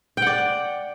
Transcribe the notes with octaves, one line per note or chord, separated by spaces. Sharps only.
D5 F#5 G5